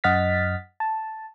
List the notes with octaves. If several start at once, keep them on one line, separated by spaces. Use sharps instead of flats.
F#2 D#5 F#5 F6 A6 B6
A5